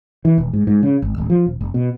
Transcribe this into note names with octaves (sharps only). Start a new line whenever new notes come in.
E3
E1
G#2
G#2
C#3
G#1
D1
F3
D#1
F#1
B2